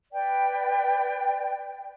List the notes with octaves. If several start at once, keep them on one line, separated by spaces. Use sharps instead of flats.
B4 D5 G5